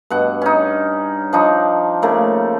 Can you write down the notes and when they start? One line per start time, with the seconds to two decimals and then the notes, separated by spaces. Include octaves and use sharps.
0.10 G2 B2 F#5
0.42 C#4 D#4
1.33 F3 D4 D#4
2.02 C#3 A3 A#3